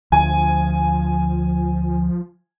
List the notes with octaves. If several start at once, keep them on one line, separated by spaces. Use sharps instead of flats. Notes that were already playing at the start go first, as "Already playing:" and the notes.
D2 F3 G#5